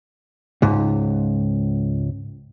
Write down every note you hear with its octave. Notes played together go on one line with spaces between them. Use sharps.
C#2 G#2